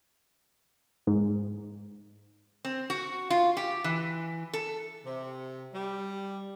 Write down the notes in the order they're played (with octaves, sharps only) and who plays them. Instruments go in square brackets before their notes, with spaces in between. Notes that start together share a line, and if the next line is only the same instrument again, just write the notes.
[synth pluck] G#2
[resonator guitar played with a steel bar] C4
F#4
F4
G4
E3
A4
[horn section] C3
G3